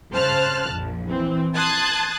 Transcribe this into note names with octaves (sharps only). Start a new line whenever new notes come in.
C#3 C5 A5 F6 F#6
A#1 F2
E3 C4
A5 C6 D#6 F#6 G#6 A6